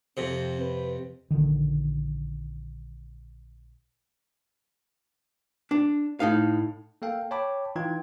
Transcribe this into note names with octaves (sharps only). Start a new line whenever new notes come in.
F2 C3 C4
B4
A#1 B2 D3 D#3
D4
A2 D#4 F5
A#3 A4 F5 G5
C#5 G5 A5 B5 D6
E3 D#4 F4 G5 G#6